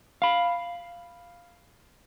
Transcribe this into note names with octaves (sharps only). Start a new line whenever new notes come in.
F5 B5